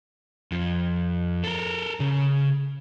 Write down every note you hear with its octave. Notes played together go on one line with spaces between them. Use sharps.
F2
A4 A#4
C#3